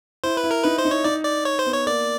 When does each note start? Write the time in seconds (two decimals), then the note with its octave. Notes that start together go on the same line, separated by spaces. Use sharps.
0.24 E4 C5
0.37 B4
0.44 E4
0.51 A#4
0.64 D#4 B4
0.78 C5
0.85 D#4
0.91 C#5
1.04 D#4 D5
1.24 D5
1.45 C#5
1.59 C5
1.66 B3
1.73 C#5
1.86 A#3 D5